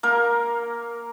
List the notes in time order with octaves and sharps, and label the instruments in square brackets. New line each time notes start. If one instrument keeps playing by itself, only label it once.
[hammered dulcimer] A#3 A#4